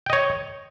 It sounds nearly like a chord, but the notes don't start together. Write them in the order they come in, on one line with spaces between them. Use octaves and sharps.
G5 D#5 C#5